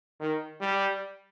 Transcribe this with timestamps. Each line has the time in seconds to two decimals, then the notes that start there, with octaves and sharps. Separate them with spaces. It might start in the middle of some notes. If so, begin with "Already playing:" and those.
0.20 D#3
0.61 G3